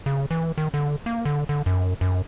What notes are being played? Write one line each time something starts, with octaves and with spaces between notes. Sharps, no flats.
C#3
E3
D#3
D3
A#3
D3
D3
F#2
F#2